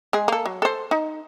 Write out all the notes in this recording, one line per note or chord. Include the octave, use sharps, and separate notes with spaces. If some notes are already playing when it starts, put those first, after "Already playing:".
G#3 G#4
A#3 A4
F#3
A4 C5
D#4